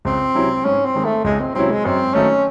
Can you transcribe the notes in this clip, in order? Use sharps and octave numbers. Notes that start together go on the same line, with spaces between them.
C#2 C4
C3 F#3 C#4 E4
G#2 C#4
C4
D#3 G#3
A3
C#2 G#3
C4
C3 F#3 C4 C#4 E4
G#3
F#2 C4
D#3 F#3 A3 C#4 D#4